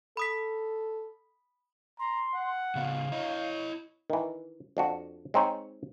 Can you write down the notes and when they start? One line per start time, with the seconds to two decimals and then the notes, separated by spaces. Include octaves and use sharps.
0.17 A4 B5 D#6 B6
1.99 A#5 C6
2.34 F#5
2.75 C#3 B3 F5
3.12 E4 C#5 D#5
4.10 D#3 E3
4.77 F2 D4 F#4
5.34 G#3 C4 D#4 C#5